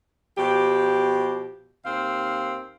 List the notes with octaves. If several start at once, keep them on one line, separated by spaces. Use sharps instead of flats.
B2 F3 G4
D#2 C4 F5